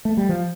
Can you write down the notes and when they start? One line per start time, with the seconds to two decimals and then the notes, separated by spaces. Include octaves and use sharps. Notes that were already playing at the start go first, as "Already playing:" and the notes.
0.05 A3
0.17 G3
0.29 F3